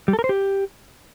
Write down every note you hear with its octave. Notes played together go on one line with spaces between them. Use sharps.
G3
A4
A#4
C5
G4